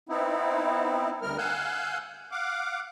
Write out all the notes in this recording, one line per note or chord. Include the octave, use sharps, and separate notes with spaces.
B3 C4 D#4 E4
D2 G3 A#4 F6
F5 F#5 G#5 E6 F#6 G6
F5 F#5 D6